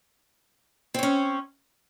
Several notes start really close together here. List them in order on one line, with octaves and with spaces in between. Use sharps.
C4 C#5 C#4